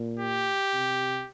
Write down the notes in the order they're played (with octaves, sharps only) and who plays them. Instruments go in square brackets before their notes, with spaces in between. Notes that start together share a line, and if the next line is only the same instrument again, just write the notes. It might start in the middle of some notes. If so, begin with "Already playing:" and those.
Already playing: [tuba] A#2
[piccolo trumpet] G4
[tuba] C3